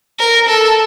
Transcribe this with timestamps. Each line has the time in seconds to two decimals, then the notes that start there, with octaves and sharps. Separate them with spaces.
0.19 A#4
0.48 A4